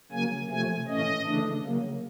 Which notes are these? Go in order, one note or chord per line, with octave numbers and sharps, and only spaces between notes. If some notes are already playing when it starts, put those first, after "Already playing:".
C#3 F#3 A#3 G#5
C3 F3 A3 G#5
A2 E3 A3 C#4 D#5
C#3 E3 A3 D4
C#3 F#3 A#3